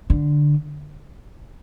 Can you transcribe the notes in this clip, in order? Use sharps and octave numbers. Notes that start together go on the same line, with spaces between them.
D3